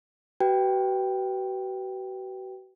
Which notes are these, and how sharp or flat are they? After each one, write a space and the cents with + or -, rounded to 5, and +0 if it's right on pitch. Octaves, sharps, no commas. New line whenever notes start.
F#4 +40 B4 +0 G5 +0